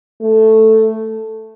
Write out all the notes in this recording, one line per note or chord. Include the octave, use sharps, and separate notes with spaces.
A3